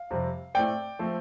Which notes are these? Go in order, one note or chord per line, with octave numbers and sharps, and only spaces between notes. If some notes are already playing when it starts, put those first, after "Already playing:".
Already playing: F5
F2 C3 G3 C4
A2 A3 C4 D5 G5
F3 A3 C4